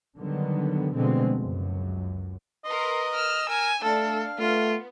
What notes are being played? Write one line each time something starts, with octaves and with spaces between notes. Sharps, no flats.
D3 D#3 F#3 G3 B3
B2 D3 F3 G#3 A3 C4
C#2 F#2
A#4 B4 D#5 C6
E6 F6
A#4 G#5
A3 D4 A4 F5
A3 B3 F4